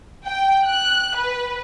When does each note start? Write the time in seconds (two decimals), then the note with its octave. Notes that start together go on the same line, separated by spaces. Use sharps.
0.24 G5
0.65 F#6
1.15 B4